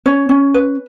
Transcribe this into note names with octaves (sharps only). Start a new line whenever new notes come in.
C#4 C#5
C#4
B4